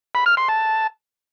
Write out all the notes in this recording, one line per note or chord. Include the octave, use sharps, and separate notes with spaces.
B5
F6
C6
A5